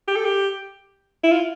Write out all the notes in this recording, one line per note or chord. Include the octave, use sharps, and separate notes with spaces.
G4
A4
G4
E4
F4